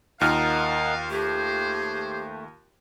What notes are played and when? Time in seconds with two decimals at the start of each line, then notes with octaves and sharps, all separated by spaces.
0.21 D#2 D#4 F4 A#4 D#5 F5 F#5 F6
1.11 A3 G4 G#4 C5